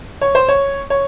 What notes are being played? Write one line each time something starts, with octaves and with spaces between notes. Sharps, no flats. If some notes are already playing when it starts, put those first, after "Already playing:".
C#5
C5
C#5
C#5